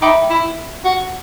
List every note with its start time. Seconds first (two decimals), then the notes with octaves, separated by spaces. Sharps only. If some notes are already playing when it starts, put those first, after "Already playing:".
0.01 D#4 E5 G5 B5 D6
0.30 E4
0.85 F#4